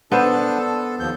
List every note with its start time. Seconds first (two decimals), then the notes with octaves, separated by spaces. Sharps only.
0.12 B3 D4 A4 C5 A5
0.60 A4
1.00 D#2 F3 G6